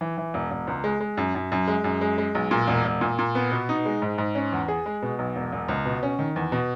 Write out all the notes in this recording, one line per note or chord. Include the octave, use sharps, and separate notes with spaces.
E3
E3
E1
E1
C#2
G#3
G#3
F#2
F#2
F#2
G#3
F#2
G#3
G#3
B1
A#2
E1
E1
A#2
A#2
B3
B2
D#4
G#3
G#2
G#2
C#4
E2
G#4
G#3
B2
B1
E1
E1
C#2
B2
C#4
D#3
E2
B2